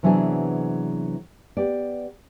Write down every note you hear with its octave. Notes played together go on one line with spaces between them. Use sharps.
C3 E3 F#3 B3 D4 G#4
B3 G4 D5